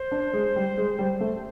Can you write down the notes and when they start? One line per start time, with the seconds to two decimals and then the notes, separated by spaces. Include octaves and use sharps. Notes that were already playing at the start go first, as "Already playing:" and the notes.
Already playing: C5
0.11 D4
0.33 G#3
0.56 G3
0.78 G#3
0.99 G3
1.21 A3